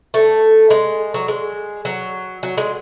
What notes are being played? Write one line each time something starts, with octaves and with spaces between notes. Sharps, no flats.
A3
G#3
F#3
G#3
F#3
F#3
G#3